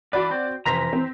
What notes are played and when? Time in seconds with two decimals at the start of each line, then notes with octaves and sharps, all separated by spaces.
0.13 E3 D4 F#4 B4 D5
0.31 C4
0.66 F1 E3 C5 A#5 A#6 B6
0.93 C4